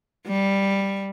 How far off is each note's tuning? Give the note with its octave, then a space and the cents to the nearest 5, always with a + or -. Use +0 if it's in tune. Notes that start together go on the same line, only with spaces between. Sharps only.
G3 +5